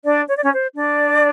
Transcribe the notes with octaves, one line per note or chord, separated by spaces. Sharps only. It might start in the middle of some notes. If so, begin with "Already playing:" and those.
D4 D5
C#5
D5
C#4 C#5
C5
D4 D5